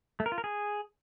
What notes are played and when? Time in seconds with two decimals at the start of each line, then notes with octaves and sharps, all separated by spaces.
0.20 A3
0.26 A#4
0.32 F4
0.38 A#4
0.44 G#4